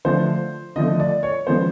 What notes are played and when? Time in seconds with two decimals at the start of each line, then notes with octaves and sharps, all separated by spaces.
0.05 D3 F3 A3 C5
0.76 D3 F3 A3 D#5
1.00 D5
1.23 C#5
1.47 C#3 F3 G#3 B3 C5